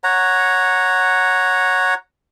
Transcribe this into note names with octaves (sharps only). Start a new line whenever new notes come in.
C#5 F#5 A#5